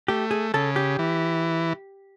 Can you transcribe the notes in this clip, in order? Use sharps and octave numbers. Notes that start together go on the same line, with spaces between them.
A3 G4
G#4
C#3 A4
G4
E3